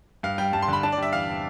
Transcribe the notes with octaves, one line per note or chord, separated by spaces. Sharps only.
G2 F5
G3 G5
G2 A5
C6
D3 B5
D4 A5
D5
G3
E5
E2 F5
C3